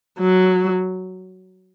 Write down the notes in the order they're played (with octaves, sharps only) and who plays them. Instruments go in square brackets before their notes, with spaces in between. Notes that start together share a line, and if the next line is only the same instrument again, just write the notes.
[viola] F#3